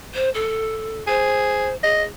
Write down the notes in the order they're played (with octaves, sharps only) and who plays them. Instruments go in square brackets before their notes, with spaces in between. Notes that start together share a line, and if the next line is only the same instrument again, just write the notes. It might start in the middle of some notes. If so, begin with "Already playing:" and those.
[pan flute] C5
A4
[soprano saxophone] G#4 [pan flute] C5
[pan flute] G#4 [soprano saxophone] D#5